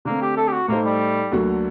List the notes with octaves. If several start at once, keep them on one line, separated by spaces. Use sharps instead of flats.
D3 A3 A#3 C4
G4
A4
G4
F#4
A2 A3 A#3 D#4 A4 C5
G3
D2 D3 F#3 A#3 F#4